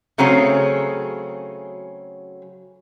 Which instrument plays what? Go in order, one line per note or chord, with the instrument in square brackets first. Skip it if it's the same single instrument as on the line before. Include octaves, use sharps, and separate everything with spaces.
[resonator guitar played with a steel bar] C#3 F#3 A3 C4 C#4 G#4